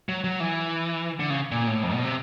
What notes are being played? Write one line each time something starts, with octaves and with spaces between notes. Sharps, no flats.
F#3
F#3
E3
D3
C#3
A#2
A2
F2
B2
C3